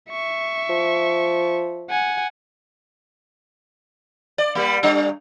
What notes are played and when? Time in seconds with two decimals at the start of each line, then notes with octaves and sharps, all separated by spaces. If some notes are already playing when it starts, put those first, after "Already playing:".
0.10 E5 C#6
0.69 F3
1.90 F#5 G#5
4.38 D5
4.55 G3 A#3
4.83 G3 D4